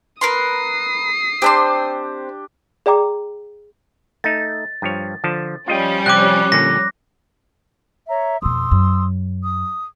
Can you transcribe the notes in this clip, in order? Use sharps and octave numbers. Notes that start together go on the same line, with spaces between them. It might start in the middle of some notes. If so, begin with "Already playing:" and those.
A#4 B4 C6 D#6 C7
C4 D4 G4 C5 C6
G#4 D5 G5 A#5 D6
A3 D#4 A6
G2 F3 C#5
D3 F3 A5
F3 G3 C#4 F4 D#5 G5
C3 G5 D6 F#6
A#2 D3 A#6
C#5 E5 A#5
F2 B2 C6 D#6 E6
F#2
D#6